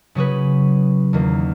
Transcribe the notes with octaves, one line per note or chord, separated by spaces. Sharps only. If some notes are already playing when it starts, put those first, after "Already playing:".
C#3 F#3 C#4 G#4 B4
E2 D#3 A#3